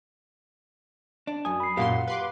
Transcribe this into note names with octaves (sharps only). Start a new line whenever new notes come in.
D4
F#2 G#5 D#6
B5 C7
F#2 A#2 G4 F5 F#5 C6
B4 C6 D6